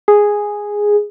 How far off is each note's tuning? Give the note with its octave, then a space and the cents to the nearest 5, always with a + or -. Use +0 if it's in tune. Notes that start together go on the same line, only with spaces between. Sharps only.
G#4 -5